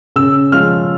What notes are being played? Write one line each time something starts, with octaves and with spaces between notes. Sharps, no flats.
C#3 E6
F3 G#3 C#4 F4 F6